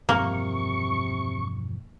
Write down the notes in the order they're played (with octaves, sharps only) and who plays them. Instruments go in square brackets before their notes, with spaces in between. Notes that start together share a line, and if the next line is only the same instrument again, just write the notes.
[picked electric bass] E1 G2 F3 [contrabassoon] C3 [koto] A#3 [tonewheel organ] C#6